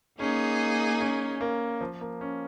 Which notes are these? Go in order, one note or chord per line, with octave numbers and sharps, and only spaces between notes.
A#3 C#4 D#4 G#4
C#4
A#3
F3
A#3
C#4